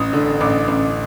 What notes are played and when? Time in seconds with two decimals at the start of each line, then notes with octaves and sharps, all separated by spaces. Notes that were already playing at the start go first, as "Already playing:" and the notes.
Already playing: A1 D#6
0.13 D3
0.41 A1 D6
0.68 A1